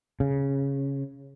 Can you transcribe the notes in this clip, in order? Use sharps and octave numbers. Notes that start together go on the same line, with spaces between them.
C#3